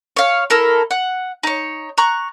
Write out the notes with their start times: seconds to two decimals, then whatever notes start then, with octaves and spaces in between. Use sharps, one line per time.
0.17 C#5 F5
0.50 E4 A4 A#4 C#6
0.91 F#5
1.43 D#4 C#5
1.98 A#5 C#6 F#6